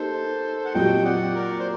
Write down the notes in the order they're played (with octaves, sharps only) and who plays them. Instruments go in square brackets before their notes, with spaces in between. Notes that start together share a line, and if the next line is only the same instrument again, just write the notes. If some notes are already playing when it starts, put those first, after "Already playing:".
Already playing: [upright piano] A#3 D#4 G4 [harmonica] A4 C5
[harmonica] F#5
[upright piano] A#2 F#3 C4 G4 [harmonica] D#5 G5
[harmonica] D5 F#5
A#4 D5
C5